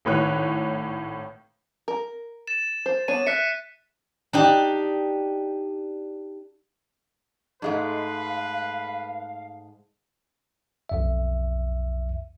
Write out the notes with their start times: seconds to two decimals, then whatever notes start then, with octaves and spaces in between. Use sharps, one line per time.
0.05 G#1 A2 B4 C#5 F#6
1.88 A#4
2.47 A6 E7
2.86 C5
3.08 B3 D4 C#5 D#7
3.27 E5 F#6 B6 C#7
4.33 D4 D#4 G4
7.62 G#2 G#3 A3 B4 F5
10.89 B1 F2 E5